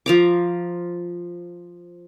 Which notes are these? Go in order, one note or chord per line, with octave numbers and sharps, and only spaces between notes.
F3 A#5 D6